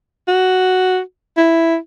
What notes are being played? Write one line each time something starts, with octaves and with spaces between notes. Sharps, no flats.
F#4
E4